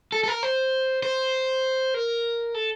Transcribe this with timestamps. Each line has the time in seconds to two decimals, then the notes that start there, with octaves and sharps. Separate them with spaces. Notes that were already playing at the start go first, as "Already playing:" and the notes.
0.12 A4
0.24 A4
0.28 A#4
0.43 C5
1.03 C5
1.94 A#4
2.55 A4